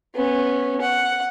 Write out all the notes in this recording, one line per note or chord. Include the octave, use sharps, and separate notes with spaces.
B3 C#4
F#5